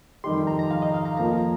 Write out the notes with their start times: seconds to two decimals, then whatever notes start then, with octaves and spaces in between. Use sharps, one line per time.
0.24 F2 D#3 G3 D#4 G4 C6
0.47 A#5
0.59 A#5
0.71 F5
0.82 D#5
0.94 F5
1.05 A#5
1.17 F2 F3 A#3 A#5